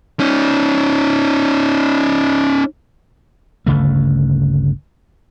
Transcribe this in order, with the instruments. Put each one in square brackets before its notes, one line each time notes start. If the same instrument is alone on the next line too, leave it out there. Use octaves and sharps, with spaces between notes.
[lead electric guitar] C#4 D#4
[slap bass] G1 D2 C#3 A3